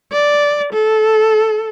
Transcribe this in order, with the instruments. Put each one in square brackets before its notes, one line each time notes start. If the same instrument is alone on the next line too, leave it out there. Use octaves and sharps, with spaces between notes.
[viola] D5
A4